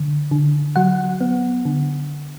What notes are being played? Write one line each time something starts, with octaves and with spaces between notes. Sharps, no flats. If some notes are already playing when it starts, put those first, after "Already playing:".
Already playing: D3
D3
F#3 F#5
B3
D3